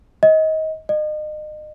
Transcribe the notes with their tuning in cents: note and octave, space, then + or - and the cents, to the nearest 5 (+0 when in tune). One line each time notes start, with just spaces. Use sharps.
D#5 +25
D#5 -35